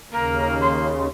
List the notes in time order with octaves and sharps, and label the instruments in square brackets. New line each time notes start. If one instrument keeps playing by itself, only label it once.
[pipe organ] D#2 C#3 [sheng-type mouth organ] A#3 [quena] A#4
[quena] C6